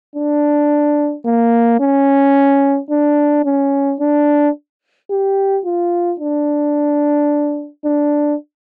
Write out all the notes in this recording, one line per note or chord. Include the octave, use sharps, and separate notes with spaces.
D4
A#3
C#4
D4
C#4
D4
G4
F4
D4
D4